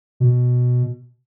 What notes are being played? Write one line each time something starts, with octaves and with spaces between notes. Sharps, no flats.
B2